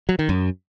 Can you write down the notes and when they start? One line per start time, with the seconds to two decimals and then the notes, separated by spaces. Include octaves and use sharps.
0.09 F#3
0.19 D#3
0.29 F#2